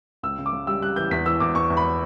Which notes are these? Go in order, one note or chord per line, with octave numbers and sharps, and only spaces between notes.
C#2 E6
C#3
D6
C#3
G3 E6
G3 F#6
E3 G6
E2 B6
E3 E6
E2 D6
E2 C#6
E2
B5